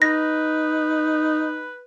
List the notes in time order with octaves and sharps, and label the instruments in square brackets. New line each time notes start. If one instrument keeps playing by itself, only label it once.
[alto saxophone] D#4 [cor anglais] B4 [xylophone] A#6